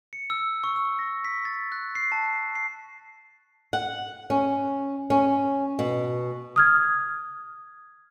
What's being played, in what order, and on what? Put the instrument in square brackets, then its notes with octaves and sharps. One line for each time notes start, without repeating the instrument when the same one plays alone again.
[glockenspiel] C#7
E6
C#6
E6
A#6
B6
A6
F#6
C7
A5
C7
[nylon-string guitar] F#5
C#4
C#4
B2
[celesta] D#6 F6 G#6